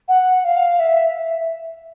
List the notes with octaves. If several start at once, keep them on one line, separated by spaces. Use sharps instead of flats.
F#5
F5
E5